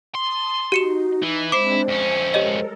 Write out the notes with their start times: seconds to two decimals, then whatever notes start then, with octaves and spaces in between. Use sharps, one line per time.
0.15 A5 C6 D#6
0.72 D#4 F#4 G4 C#7 E7
1.22 E3
1.52 G#3 C4 D4 E4 C5 D6 C7
1.88 F2 C#4 E5 G5 G#5
2.34 G#3 G4 A4 A#4 C#5 D#5